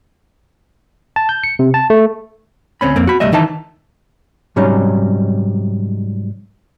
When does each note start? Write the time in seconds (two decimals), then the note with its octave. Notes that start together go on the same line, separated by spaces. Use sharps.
1.16 A5
1.29 G6
1.44 C#7
1.59 C3
1.74 A5
1.90 A3
2.81 D2 C4 C#4 B5
2.96 F2 A#3 C4
3.07 F#4 B5
3.20 C2 G3 A3 D#5 E5
3.32 D#3 E3 D#4 E5 A5
4.56 G#2 C3 F#3 G3 C#4 D#4